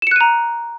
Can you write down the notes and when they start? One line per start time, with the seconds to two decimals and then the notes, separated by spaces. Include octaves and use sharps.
0.02 E7
0.07 C#7
0.11 F#6
0.16 D#7
0.21 A#5